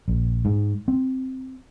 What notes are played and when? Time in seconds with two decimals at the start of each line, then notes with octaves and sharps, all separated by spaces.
0.08 A#1
0.45 G#2
0.88 C4